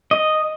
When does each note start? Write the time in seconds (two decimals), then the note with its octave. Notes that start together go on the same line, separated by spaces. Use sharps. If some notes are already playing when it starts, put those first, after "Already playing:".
0.11 D#5